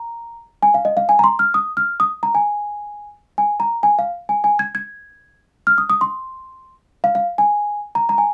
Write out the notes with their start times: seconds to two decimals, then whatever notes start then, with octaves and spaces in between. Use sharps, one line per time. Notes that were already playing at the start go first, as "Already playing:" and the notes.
Already playing: A#5
0.63 G#5
0.74 F5
0.85 D#5
0.97 F5
1.09 G#5
1.19 A#5
1.24 C6
1.39 F6
1.54 D#6
1.77 F6
2.00 D#6
2.23 A#5
2.35 G#5
3.38 G#5
3.60 A#5
3.83 G#5
3.99 F5
4.29 G#5
4.44 G#5
4.59 G#6
4.75 G#6
5.67 F6
5.78 D#6
5.90 D#6
6.01 C6
7.04 F5
7.15 F5
7.38 G#5
7.95 A#5
8.09 A#5
8.18 G#5